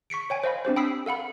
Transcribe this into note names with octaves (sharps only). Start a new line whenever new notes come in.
C#6 B6 C#7 D7
C#5 G5 G#5
C5 D#5 F5 B5
C4 D4 G4 C5
G5 B5 D#6 E6 B6 C7
A4 F5 F#5 B5